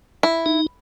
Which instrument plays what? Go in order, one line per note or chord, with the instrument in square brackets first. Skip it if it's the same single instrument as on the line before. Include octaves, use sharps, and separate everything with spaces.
[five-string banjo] E4
[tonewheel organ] D#4